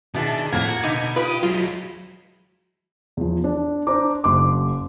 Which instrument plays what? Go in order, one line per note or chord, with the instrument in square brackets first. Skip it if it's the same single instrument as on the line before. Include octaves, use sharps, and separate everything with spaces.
[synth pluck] B2 [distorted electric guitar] D#3 [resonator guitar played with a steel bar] D4 E4 G#4 [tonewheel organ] A5
[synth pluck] F2 A2 [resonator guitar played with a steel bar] F3 A#3 F5 [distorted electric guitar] F#4 [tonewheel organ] G#6
[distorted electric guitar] B2 [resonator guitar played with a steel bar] D3 B3 D#4 [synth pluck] D6
[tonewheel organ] F4 D#6 [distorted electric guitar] G4 [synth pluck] B4 B5
[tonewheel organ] F#3 [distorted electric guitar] G#3 E4 [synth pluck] F4
[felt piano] E2 F3
D4
D4 C5 A#5 D6
F#1 C6 D6